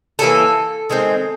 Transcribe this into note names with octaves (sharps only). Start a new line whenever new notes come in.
E3 G3 A#3 C#4 A4
D#3 G#3 C4